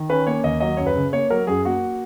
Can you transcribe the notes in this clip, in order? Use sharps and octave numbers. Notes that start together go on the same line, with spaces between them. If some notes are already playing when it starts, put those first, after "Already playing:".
Already playing: D#3
C#4 B4
A#3 C#5
D#2 D#5
F#3 D#5
F#2 C#5
B4
C#3
A#3 C#5
F#3 A#4
F#2 G#4
A#3 F#4